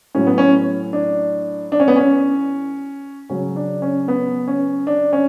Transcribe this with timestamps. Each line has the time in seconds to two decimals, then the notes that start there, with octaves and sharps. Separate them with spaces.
0.15 A2 F#3 C#4
0.27 B3
0.38 C#4
0.93 D4
1.72 D4
1.80 C#4
1.88 B3
1.96 C#4
3.29 C#3 F#3 C#4
3.56 D4
3.82 C#4
4.08 B3
4.48 C#4
4.87 D4
5.13 C#4